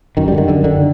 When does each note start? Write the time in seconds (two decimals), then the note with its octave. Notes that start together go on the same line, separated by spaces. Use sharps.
0.17 F#2 D#3
0.28 D3 G3
0.38 D#3
0.48 F#2 D3
0.64 D3 D#3